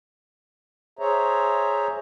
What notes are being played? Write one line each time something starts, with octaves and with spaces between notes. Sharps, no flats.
G#4 C5 C#5 E5 A#5